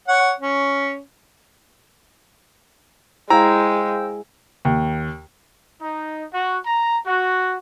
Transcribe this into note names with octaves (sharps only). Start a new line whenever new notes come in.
C#5 F#5
C#4
G#3 E4 C5 F5 G5 A#5 E6
D#2
D#4
F#4
A#5
F#4